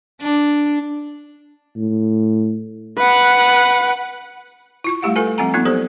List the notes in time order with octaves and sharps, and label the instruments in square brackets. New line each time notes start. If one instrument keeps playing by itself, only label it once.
[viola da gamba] D4
[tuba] A2
[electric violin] B4 F#5
[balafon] E4 F4 C#6
G3 A3 E4 G4 F5 F#5
F4 A4 B4 G#5
F3 G3 C4 F#5 G#5 A#5
F3 A#3 B3 D#4 F4
F#3 G4 A4 C5